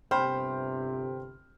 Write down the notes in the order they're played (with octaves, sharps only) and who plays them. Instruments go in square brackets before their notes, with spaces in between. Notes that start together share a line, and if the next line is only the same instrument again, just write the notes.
[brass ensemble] G1 C3 [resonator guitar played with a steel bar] C5 [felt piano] G5 B5 F6